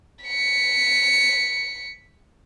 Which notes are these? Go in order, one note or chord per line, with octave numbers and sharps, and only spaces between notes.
B6 C#7